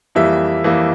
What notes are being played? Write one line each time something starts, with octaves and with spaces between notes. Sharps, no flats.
F2 E3 G3 A#3 E5
F2 E3 G3 A#3